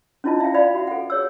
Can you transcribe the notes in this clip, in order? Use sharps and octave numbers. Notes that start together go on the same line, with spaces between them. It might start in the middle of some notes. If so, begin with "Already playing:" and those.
C#4 D4 E4 F4 D#5 A5
E5 F5 G5
D5 E5 F5 G5 B5
F#4 E5
A4 F#5
G#4 C#5 E6